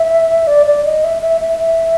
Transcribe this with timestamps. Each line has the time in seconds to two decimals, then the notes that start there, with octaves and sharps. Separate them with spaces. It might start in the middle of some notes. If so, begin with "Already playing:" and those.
Already playing: E5
0.47 D5
0.67 D5
0.85 D#5
1.04 E5
1.22 E5
1.41 E5
1.59 E5